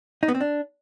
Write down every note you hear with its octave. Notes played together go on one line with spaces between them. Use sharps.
D#4
B3
C4
D4